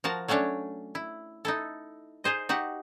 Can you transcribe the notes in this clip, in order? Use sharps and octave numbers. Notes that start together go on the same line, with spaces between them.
F3 F#4 A#4 A5
F#3 A3 C#4 D4 C#5
E4
D#4 E4 A4
D#4 G#4 C5 D#5
D#4 F#4 G4 F#5